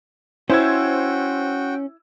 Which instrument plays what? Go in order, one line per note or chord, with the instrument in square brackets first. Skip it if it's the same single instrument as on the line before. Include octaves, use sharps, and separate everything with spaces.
[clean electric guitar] C#4 [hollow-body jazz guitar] E4 [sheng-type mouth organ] F#4 G5 [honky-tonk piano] C5 E6 G#6